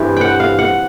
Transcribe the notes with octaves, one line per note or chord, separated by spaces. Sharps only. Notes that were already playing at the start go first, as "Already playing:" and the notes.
Already playing: G2 E3 G3 C4
F#5 G5
F5
F#5